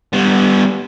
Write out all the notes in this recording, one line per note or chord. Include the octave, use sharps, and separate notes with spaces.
G3 B3